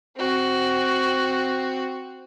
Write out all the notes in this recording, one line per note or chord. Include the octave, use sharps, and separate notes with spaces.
C4 F#4